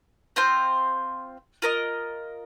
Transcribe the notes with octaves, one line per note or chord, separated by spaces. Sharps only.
C4 F4 C5
F4 A#4 D#5